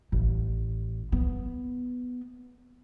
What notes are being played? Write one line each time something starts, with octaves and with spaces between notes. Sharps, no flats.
A1
B3